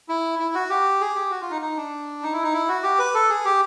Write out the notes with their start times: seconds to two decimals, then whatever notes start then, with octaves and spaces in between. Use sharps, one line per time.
0.09 E4
0.39 E4
0.55 F#4
0.70 G4
1.01 G#4
1.15 G4
1.31 F#4
1.41 F4
1.51 D#4
1.62 D#4
1.77 D4
2.23 D#4
2.33 E4
2.43 D#4
2.53 E4
2.68 F#4
2.83 G4
2.99 B4
3.14 A4
3.30 G#4
3.45 G4